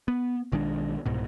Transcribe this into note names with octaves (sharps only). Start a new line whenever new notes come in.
B3
B1 D#3 G#3 D4
C2 G#2 B2